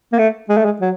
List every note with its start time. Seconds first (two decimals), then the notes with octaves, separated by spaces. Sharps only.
0.13 A#3
0.19 A3
0.49 G#3
0.57 A3
0.65 G#3
0.81 F#3